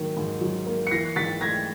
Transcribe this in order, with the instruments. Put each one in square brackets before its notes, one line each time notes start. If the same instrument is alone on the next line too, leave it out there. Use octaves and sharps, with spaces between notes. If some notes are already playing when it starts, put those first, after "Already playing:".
Already playing: [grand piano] G#2 D#3 F#3 A#3
G#2
F#3
A#3
C#7
E3 A#6 C7
G#2 A6 B6
A3 G#6 A#6